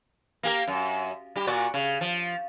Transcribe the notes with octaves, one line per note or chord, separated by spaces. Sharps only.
A#3 G4 A#4
F#2
G3 G4
A#2 F#4 D5
C#3
F3